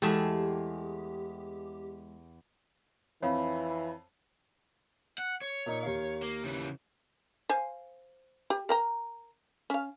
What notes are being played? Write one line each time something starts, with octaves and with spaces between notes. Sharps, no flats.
E2 G#3 A3 G4 G#4 E5 A5
F2 E3 C#5 F5 B5
F#5
C#5
A#2 D#4
D#2 F5
A#3
C#3 E3
C5 F5 G#5
G4
A#4 G5 A#5
C#4 F5